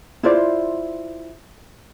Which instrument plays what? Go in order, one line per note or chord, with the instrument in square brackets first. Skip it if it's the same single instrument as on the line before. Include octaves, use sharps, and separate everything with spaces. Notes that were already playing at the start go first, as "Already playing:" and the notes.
[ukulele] E4 F4 C5 D5